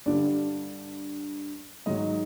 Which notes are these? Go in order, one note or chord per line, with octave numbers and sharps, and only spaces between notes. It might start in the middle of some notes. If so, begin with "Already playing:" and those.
G2 D3 G3 D5
G#2 D#3 F#3 D#5